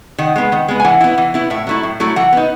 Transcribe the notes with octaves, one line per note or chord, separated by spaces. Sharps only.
D#3 F#5
G#3 B3
D#3
G#3 B3
G#5
E3 F#5
B3 E4
E3
B3 E4
A2 E5
F#3 A3 E4
A2
F#3 A3 E4
E3 F#5
B3 D#4